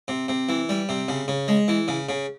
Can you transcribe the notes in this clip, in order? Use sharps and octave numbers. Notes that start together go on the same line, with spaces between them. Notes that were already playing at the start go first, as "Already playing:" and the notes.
C3
C3
E3
G3
C3
C#3
C#3
G#3
E3
C#3
C#3